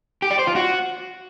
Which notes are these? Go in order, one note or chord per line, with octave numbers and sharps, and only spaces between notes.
G4
D5
C5
F4
F#4